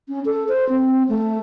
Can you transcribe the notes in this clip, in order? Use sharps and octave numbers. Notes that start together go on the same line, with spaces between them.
C#4
A4
C5
C4
A3